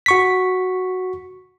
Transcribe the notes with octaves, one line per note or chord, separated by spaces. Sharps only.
F#4 C#6 B6